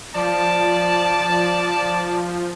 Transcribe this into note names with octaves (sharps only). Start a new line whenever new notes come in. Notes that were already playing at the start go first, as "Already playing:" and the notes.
F3 D5 A5